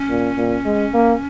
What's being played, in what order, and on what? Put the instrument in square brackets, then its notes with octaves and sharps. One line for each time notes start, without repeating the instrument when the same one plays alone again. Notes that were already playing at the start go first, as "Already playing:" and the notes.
Already playing: [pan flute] C#4
[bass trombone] A#2
A#2
G#3
A#3